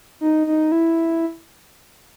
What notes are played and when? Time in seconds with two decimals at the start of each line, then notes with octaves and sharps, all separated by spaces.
0.21 D#4
0.47 D#4
0.72 E4